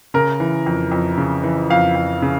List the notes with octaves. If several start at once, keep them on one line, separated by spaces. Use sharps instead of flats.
C#3 A#4
E3
F2
F2
C#3
E3
F2 F5
F2
C#3